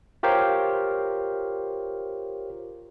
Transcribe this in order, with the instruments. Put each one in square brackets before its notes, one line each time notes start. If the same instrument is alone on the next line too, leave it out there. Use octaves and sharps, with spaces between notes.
[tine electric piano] F4 G4 A#4 C5 C#5 F5